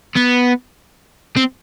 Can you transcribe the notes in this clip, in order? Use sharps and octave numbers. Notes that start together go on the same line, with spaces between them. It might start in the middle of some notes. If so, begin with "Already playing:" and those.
B3
C4